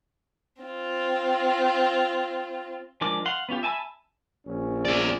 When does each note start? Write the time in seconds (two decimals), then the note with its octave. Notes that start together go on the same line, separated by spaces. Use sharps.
0.62 C4 F4
3.01 F3 G#3 D4 A#4 D6
3.26 F5 F#5 C6
3.49 B3 C#4 F4 G4
3.63 E5 G#5 A5 B5 E6
4.46 A#1 C#4
4.85 G#4 D5